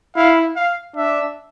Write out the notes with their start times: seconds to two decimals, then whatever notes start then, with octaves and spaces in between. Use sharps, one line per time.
0.16 E4 F5
0.56 F5
0.96 D4 E5